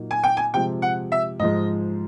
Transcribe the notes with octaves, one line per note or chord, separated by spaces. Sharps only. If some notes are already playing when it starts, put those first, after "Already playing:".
Already playing: A#2 F#3 A#3 D#4
G#5
G5
G#5
C3 F3 G#3 G5
F#5
E5
G#2 F3 G#3 D#5